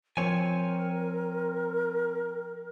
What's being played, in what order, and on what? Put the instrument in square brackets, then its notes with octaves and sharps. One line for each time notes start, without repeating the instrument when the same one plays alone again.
[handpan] F3 [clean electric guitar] C4 C#5 G#5 [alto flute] A#4